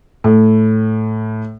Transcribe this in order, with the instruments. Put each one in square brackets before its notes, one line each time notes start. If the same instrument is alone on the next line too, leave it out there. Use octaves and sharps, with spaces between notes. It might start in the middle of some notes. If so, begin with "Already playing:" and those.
[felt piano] A2